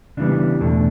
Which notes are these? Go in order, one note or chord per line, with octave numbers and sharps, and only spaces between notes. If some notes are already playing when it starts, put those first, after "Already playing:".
C#3 E3 G3 B3 D4
E2 B2 A3 D4